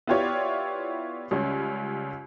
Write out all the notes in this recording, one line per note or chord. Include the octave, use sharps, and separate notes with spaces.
B3 E4 F4 G4 C#5 D5
C#2 G3 C#4